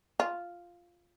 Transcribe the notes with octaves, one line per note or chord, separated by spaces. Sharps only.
F4